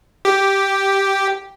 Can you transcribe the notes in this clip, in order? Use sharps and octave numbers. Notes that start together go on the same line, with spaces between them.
G4